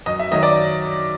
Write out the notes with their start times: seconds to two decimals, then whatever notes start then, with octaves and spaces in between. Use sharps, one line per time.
0.06 F#2 D#5
0.19 E5
0.31 D#3 F#3 D#5
0.43 D5